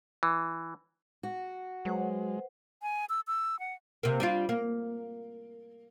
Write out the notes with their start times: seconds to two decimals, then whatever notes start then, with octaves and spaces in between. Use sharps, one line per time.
0.23 E3
1.23 F#4
1.85 F#3 G#3 B4 C5 F#5
2.82 G#5
3.09 E6
3.27 E6
3.60 F#5
4.03 C3 A#3
4.20 G3 D4 F4
4.49 A#3